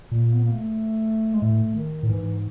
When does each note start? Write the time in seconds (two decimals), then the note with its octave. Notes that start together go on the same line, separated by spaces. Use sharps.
0.11 A#2 A#3
0.33 B3
0.45 A#3
0.54 A3
1.33 G#3
1.42 A2 A3
1.76 D#3
2.03 A2
2.08 G#2 E3